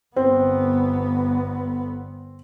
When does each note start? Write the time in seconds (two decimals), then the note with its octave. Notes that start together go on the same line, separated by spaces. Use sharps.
0.16 G1 B3 C4